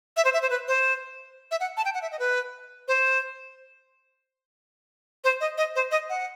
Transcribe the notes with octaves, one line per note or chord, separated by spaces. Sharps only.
E5
C5
E5
C5
B4
C5
E5
F#5
A5
G5
F#5
E5
D#5
B4
C5
C5
D#5
D#5
C5
D#5
F#5